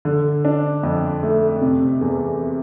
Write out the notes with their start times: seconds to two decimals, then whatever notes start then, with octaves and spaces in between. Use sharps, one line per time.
0.05 D3
0.45 D4
0.83 F2
1.23 A3
1.62 C3
2.01 E2